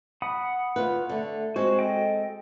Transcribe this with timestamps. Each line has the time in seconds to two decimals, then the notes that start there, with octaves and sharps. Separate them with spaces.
0.22 F#5 B5 D#6
0.76 D2 F4 B4
1.09 D3 A3
1.56 G#3 C4 F#4 C5
1.79 A4 D#5 G5